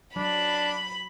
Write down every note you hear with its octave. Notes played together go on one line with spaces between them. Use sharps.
F#3 D4 B5